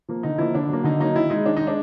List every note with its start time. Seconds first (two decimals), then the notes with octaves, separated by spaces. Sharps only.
0.08 F3 A#3
0.23 D3 D#4
0.38 F3 A#3 E4
0.55 D3 D4
0.69 F#3 A#3
0.84 D3 D#4
1.00 F#3 A#3 D#4
1.15 D#3 E4
1.30 G#3 D#4
1.45 D#3 D4
1.57 G#3 D#4
1.67 D4